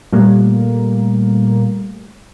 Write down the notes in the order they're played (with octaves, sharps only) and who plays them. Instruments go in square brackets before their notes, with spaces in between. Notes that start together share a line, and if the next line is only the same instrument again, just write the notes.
[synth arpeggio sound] A#2 A#3 [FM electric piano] G3 A3